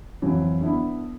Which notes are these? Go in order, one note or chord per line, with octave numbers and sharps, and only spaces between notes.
F2 E3 F#3
D3 B3 E4